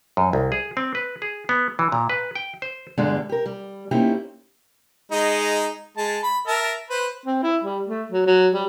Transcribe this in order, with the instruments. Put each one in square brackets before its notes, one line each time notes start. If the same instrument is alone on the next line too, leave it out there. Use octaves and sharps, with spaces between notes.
[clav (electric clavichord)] F#2
C2
G#4
C4
B4
G#4
B3
E3
A#2
B4
G5
C5
[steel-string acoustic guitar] E2 G2 D3 G3 G#3
G4 A#4
G3
A#3 C4 C#4 D#4 E4 G4
[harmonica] G#3 D#4 D#5
G#3 A5
B5
A#4 E5 A5
B4 C5
[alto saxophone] C4
E4
G3
A3
F#3
F#3
G3